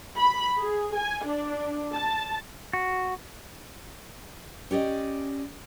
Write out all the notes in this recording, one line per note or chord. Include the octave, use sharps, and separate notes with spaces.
B5
G#4
G#5
D4
A5
F#4
C#4 G4 D5 D#5